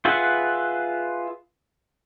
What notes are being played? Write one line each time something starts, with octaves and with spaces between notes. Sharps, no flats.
F4 G#4 B4 E5 F#5